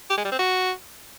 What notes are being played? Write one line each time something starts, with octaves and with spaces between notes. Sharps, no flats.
G4
G#3
G3
C4
F#4